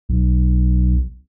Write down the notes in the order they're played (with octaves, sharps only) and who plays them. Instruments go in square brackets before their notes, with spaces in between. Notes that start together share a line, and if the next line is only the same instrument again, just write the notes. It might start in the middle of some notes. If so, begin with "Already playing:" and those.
[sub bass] B1